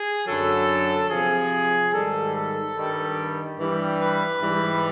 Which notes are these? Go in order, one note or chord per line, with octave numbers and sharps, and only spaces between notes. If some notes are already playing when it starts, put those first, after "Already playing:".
Already playing: G#4
F#2 D3 F#3 A4
C3 F3 G#4
G#2 D#3 G3 A4
A4
G2 D#3 G3
G2 E3 G3
B4
G#2 E3 G3